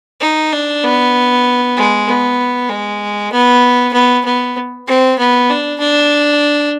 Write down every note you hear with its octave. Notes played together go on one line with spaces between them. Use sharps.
D#4
D4
B3
G#3
B3
G#3
B3
B3
B3
C4
B3
D4
D4